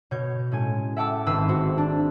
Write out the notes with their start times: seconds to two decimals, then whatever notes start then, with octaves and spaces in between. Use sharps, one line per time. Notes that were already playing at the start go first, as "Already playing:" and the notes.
0.11 B2 C#5 G6
0.52 A2 G#3 C#4 G#5
0.96 E5 F#5 G5 A5 D6 E6
1.26 G#1 G#2 C4 B4 C6 E6
1.48 F#4 C5
1.78 D4